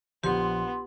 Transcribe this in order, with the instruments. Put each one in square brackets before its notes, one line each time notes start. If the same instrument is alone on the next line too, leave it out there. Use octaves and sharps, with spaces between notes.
[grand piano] A#1 [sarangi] B3 [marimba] G4 [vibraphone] C6